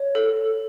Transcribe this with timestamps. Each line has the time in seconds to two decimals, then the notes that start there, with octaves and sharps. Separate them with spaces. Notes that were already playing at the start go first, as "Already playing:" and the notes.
Already playing: C#5
0.15 A4
0.37 A4